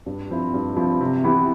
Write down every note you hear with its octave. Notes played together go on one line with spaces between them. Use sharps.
G2
F3 C4 E4
G2
F3 C4 E4
C3
E3 B3 E4 G4